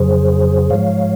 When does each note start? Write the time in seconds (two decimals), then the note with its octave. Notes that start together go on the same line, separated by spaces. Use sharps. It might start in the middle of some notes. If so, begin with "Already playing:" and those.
Already playing: F2 C#3 F#3 G#4 C5
0.70 G#2 F3 G#3 C#5 F5